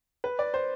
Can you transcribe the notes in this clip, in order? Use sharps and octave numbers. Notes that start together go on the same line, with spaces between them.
B4
D5
C5